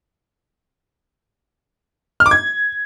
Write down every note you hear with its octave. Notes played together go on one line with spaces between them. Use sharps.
F6
D6
G#6